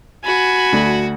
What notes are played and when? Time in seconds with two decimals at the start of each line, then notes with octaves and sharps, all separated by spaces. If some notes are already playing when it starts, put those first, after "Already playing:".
0.25 F#4 G#5 B5
0.73 D2